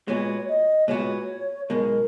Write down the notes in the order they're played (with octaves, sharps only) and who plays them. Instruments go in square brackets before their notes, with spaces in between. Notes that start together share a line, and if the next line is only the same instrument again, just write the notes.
[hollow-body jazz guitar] A#2 G#3 B3 F#4 [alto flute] C#5
[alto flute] D#5
[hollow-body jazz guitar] A#2 G#3 B3 F#4 [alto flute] C#5
[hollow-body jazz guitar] B1 B2 G#3 [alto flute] A#4